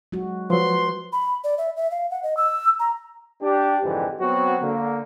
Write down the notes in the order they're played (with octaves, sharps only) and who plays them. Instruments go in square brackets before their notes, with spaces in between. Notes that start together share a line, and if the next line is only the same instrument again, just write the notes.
[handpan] F#3 G#3 F#4
[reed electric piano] F3 F#3 [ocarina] B4 [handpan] C5 [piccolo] C6
[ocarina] B5
D5
E5
E5
F5
F#5
D#5
E6
A#5
[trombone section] D4 G4
F2 G#2 D3 E3 G4
F#3 B3 C4 F#4
D3 A#3